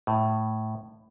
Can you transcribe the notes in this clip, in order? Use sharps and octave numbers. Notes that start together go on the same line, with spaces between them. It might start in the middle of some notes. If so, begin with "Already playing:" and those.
A2